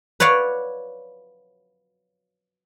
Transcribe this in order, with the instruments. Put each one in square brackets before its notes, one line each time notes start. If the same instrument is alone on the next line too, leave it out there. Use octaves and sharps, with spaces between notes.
[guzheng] B4 C#5 D5 F5 F#5